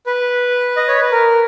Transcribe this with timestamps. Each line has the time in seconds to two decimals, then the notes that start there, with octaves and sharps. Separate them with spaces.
0.06 B4
0.77 D#5
0.88 C#5
1.01 B4
1.12 A#4